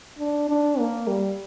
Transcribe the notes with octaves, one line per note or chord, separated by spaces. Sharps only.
D4
D4
A#3
G3